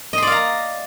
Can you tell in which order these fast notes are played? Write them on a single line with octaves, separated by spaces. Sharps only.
D#5 C6 D5 F5 A#5